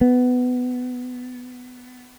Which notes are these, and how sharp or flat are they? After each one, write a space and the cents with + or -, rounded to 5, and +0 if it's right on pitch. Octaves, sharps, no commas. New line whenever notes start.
B3 +15